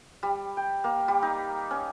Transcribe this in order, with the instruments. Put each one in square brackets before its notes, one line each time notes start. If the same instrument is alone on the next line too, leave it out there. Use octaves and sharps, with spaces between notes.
[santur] G3
G5
A#3
G3
D#4
C#4